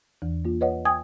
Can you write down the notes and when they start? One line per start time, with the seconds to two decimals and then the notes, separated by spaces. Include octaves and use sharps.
0.22 E2 E3
0.45 A#3 F4
0.61 B4 C#5 D#5 F#5
0.85 G5 G#5 D#6 G#6